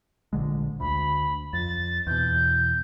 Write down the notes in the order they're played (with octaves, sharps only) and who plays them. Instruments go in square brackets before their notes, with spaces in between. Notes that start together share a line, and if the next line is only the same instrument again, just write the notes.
[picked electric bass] A#1 D3 G#3
[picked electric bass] D2 [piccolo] B5
[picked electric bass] F2 [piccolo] A6
[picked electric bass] E2 B2 [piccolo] G6